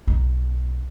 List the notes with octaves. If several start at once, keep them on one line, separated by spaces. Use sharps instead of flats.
B1 D#4